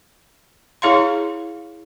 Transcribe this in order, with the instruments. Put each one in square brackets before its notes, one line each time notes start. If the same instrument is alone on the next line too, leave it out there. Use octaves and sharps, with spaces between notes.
[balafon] E4 G#4 C#5 F5 A#5 C6